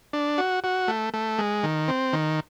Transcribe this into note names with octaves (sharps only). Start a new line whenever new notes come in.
D4
F#4
F#4
A3
A3
G#3
D#3
C4
D#3